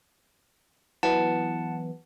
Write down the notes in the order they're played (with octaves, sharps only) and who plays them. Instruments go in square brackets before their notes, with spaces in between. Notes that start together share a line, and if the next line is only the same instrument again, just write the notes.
[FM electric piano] E3 F#3 B3 [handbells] F#5 A5